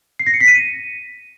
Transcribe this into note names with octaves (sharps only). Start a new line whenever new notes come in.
C7
A#6
C#7
B6
D#7